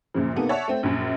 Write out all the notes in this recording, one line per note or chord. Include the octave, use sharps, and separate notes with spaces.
F#2 A#2 C#3 F3
C3 A#3 B3 D#4 A4
C#5 D5 E5 F#5 A5
A3 C4
A#1 F#2